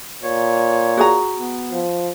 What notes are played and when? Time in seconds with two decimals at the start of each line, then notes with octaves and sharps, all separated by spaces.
0.23 A#2 C#5
0.97 F#4 G#4 A#5
1.36 B3
1.71 F3